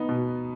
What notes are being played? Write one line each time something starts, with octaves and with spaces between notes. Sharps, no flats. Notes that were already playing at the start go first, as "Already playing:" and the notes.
Already playing: B3 D#4
B2